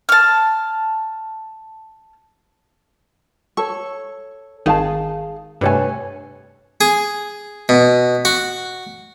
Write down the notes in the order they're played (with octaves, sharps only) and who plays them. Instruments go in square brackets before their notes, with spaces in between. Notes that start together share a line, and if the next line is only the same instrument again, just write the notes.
[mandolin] A5 F6
[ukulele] A4 C#5 [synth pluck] C#6
[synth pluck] G#1 D#3 D#4 [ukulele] G#4 F5 A5
[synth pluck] G2 C3 A3 [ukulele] B4 C#5 G#5
[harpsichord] G#4
B2
F#4